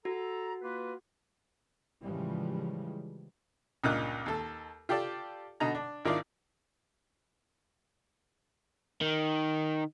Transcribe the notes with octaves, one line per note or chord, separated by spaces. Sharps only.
F#4 A4 A#5
A#3 F4 B4
A2 C#3 E3 F3 G3 G#3
C#2 G2 A#2 D#4 F#6
D#2 A4
F4 G4 A4 D5 A5
B2 D3 D#4 A#5
D4
G#1 D#3 D4 E4 F4 D5
D#3